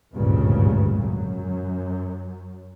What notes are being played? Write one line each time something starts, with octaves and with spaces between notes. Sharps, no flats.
G#1 D2 G2 A#2 C#3
F#2